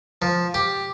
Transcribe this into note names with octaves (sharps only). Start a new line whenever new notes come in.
F3
G4